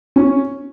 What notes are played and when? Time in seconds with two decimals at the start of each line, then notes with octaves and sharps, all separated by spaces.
0.16 C#4